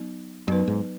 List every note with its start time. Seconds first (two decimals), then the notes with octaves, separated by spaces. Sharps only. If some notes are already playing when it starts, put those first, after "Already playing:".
Already playing: F#3 B3 D#4
0.48 F#2 F#3 B3 D#4 B4
0.68 G#2